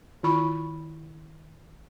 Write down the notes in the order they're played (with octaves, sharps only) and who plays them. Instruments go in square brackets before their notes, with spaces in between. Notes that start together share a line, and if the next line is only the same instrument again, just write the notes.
[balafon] D#3 E4 F4 B5 C#6